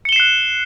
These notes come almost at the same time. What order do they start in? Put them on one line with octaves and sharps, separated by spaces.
C#7 G7 E7 C7 F#6